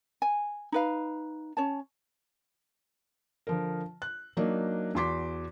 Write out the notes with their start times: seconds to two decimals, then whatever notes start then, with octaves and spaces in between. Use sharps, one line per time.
0.22 G#5
0.72 D#4 B4 F5
1.57 C#4 C#5 A5
3.47 D3 F3 A#4
4.02 F#6
4.37 F#3 A#3 D4 D#4
4.95 E2 F#4 C6 D6 B6